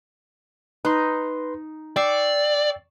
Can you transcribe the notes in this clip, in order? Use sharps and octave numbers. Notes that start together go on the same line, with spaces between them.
D#4 B4 C6
D5 G5 C#6 E6 C7